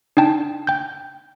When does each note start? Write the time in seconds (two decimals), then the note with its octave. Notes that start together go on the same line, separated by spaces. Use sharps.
0.17 D4 D#4 G5 A5
0.67 G5 G6